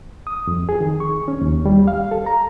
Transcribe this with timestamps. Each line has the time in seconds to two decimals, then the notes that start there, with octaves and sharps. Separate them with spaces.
0.27 D#6
0.47 F2
0.69 G#4
0.80 D#3
1.00 C#6
1.28 C#4
1.41 D#2
1.66 G3
1.88 F5
2.11 A4
2.26 A#5